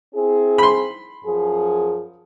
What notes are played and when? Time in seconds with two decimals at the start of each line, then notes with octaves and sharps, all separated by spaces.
0.15 C4 E4 G#4
0.58 B5 C6
1.24 F#2 F3 G#4